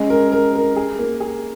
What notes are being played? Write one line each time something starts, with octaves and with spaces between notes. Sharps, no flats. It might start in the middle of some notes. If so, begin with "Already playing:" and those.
Already playing: G#3 C#4
A#4
A#4
A#4
G#4
A#3
G#4